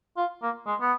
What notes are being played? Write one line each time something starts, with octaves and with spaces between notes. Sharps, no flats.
F4
A#3
G#3
B3